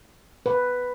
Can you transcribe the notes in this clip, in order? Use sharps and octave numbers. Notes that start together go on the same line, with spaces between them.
B4